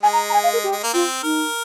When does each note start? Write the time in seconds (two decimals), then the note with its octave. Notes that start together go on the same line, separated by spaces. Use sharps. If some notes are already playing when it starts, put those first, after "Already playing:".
0.03 G#3 G#5
0.13 A#5
0.29 A#5
0.33 G#5
0.44 F5
0.53 A#4
0.64 G4
0.72 G#3
0.83 A#3
0.93 C4 F4
1.23 D#4 A#4